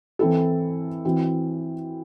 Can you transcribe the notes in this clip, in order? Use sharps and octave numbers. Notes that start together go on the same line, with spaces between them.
E3 C4 E4 A4
E3 C4 F#4